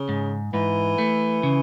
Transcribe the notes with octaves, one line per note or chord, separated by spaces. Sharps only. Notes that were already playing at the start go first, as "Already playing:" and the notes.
Already playing: C#3
G#2
G#2 E3
A3
C#3